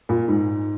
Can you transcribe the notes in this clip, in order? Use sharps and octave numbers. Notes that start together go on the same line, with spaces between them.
A#2
G#2